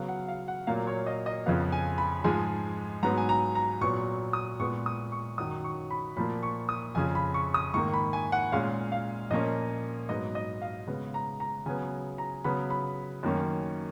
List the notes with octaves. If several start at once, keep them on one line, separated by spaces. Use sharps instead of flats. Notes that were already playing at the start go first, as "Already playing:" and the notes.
Already playing: C#3 F#3 B3 F5
F#5
F5
F#5
A#2 F#3 A#3 F5
C#5
D#5
D#5
F2 C#3 F3 B3 F5
G#5
B5
G#2 F3 G#3 G#5
G#2 F#3 B3 A#5
G#5
A#5
A#5
A#2 F#3 B3 C#6
D#6
A#2 G#3 B3 C#6
D#6
C#6
F#2 D#3 F#3 D#6
C#6
B5
A#2 F3 A#3 B5
C#6
D#6
F2 C#3 F3 G#5
B5
C#6
D#6
G#2 D#3 A#3 C#6
B5
G#5
F#5
A#2 G#3 C#4 F5
F5
A#2 F3 A#3 C#4 D#5
G#2 F#3 B3 D#5
D#5
F5
C#3 G#3 B3
A#5
A#5
C#3 F#3 B3 G#5
A#5
C#3 F#3 B3 B5
B5
F#2 D#3 A#3 C#4